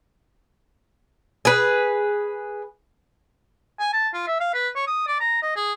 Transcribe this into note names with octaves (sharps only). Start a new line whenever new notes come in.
G#4 B4
G#5
A5
F4
E5
F5
B4
C#5
D#6
D5
A#5
D#5
G#4